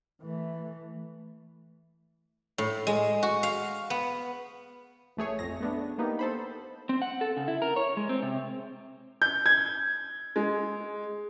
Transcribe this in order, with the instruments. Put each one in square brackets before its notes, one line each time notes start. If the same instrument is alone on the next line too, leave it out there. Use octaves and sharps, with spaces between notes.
[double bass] E3 A3
[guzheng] A2
G#3
F#4
F5
B3
[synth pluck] A1 A3 G#4 C#5
F2 A#6
A3 B3 D4
A#3 B3 D#4 G4
A4 C5 B5
[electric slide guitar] C4
F#5
A4
C#3
E4
A#4
C#5
G#3
C4
C3
[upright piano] G6
G#6
G#3